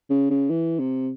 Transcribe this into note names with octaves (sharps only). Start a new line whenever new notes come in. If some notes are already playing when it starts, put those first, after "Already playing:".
C#3
C#3
E3
C3